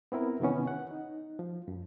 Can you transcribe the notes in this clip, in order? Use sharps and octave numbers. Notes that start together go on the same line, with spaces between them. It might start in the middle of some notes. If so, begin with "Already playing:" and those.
B3 C4 E4 A#4
C3 D#3 E3 B3 C#4
F#5
D#4
F3
F#2